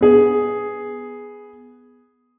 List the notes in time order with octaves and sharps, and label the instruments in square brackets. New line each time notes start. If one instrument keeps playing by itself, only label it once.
[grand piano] B3 G#4